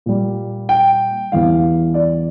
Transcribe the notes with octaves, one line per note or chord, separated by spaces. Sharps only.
A#2 G3
G5
E2 E3 G3 F5
D5